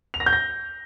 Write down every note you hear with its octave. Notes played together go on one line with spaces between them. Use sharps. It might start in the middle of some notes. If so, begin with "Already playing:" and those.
F7
A#6
G6
A#6